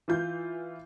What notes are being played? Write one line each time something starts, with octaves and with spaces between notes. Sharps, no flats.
E3 F4 G6